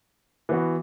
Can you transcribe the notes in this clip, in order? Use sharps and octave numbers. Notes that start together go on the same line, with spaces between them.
E3 B3 F#4